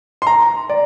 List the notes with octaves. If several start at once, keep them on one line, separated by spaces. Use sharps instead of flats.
C6
A#5
D5